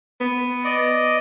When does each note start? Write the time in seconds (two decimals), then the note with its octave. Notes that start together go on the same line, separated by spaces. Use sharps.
0.21 B3
0.64 D5 D#5